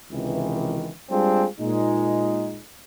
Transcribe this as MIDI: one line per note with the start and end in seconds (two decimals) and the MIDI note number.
0.12 0.91 37
0.12 0.91 48
0.12 0.91 51
0.12 0.91 52
1.11 1.46 55
1.11 1.46 56
1.11 1.46 60
1.11 1.46 62
1.11 1.46 65
1.11 1.46 68
1.60 2.61 46
1.60 2.61 56
1.60 2.61 63